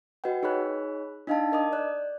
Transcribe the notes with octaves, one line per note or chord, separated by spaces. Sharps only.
F#4 B4 D#5 F#5 G5
D#4 G#4 C#5 B5 F#6
D4 D#4 D#5 F5 G5 A5
A#4 D#5 D6 D#6
D5 F#6